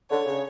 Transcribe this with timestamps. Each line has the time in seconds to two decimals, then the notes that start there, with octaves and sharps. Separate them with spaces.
0.11 D3 C#5
0.26 C#3